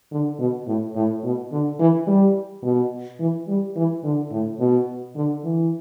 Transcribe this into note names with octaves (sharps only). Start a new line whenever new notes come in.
D3
B2
A2
A2
B2
D3
E3
G3
B2
E3
G3
E3
D3
A2
B2
D3
E3